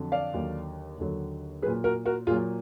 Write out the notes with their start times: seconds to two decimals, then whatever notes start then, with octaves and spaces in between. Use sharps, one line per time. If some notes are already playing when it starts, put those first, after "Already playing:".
Already playing: F2 D3 F#3
0.12 D5 F5
0.33 D#2 D3 F#3
0.98 D#2 D3 F#3
1.62 F#3 G#4 B4
1.66 A#2
1.84 F#4 A#4
2.06 F#4 A#4
2.27 A#2 F#3 F4 G#4